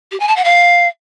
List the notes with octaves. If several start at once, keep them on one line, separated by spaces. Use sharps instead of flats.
G4
G#5
A5
F#5
F5